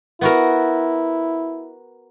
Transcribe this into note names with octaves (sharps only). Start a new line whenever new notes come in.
B3 E4 F#4 A#4